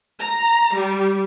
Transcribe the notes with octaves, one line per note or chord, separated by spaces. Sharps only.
A#5
G3